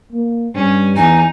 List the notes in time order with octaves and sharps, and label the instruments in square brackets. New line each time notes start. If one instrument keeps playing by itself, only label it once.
[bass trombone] A#3
[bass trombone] G2 [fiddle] C#4
[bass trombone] E2 [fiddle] D#4 [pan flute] G#5